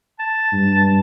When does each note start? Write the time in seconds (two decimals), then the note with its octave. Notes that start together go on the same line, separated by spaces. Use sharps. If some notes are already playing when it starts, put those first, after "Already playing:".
0.19 A5
0.53 G2